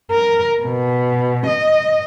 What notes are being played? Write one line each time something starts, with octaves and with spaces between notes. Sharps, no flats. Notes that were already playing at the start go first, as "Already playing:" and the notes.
A#4
B2
D#5